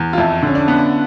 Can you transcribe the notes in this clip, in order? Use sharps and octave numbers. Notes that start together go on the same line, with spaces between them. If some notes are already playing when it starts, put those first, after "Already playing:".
Already playing: E2
F4
F2 E4
D3 C#4
D4
B3